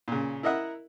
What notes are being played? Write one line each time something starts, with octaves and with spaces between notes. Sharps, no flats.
A#2 C#3
E4 A#4 D#5 E5 F#5